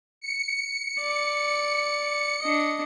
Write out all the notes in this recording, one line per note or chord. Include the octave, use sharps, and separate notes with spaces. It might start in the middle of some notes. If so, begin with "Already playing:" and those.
C#7
D5
D4 D#5